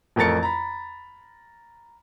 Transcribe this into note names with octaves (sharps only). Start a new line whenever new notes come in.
A1 F2 A3 A#4 A6 C#7
A#5 B5